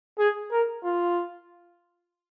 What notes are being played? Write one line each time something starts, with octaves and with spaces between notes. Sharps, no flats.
G#4
A#4
F4